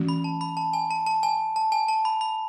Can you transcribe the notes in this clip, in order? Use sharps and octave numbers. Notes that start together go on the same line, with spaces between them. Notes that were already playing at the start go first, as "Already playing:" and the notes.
Already playing: E3 A3 C#4 F#4
B5
A5
B5
A5
G#5
A5
A5
G#5
A5
G#5
A5
B5
B5